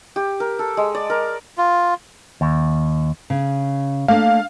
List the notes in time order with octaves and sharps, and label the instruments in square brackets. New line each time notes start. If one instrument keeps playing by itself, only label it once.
[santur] G4
A#4
A4
G#3
D5
A#4
[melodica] F4
[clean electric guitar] D#2
[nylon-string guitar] C#3
[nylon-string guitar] A3 A#3 D4 [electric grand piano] F5